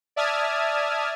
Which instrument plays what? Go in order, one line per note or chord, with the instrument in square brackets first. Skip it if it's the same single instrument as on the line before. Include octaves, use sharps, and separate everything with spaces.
[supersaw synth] D5 E5 A5 D#6 F6 G#6